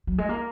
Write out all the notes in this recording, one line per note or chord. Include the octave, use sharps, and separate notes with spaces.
F#3
G#3
A#3